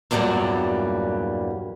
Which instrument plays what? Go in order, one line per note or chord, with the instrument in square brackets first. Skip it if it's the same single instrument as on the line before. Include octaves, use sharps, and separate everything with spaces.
[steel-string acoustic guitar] E2 G2 A#2 F#3 G3